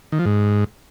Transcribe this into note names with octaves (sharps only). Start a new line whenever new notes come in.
D#3
F3
G#2